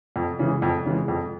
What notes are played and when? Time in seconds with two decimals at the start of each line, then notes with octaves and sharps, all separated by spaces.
0.16 F2
0.39 C#3 E3 G#3
0.62 F2
0.85 C#3 E3 G#3
1.08 F2